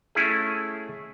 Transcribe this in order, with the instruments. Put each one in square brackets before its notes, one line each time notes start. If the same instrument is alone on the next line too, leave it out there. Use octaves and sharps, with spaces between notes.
[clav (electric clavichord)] A3 C#4 E4 G#4